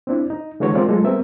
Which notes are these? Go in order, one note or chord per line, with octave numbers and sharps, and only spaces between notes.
C4 D4 E4
D#4
D3 E3 G#3 F#4 A4 C#5
G#3 C4 F4 A#4 D5
F#3 G#3 A3 F4 A4
G3 B3 C4 A#4 E5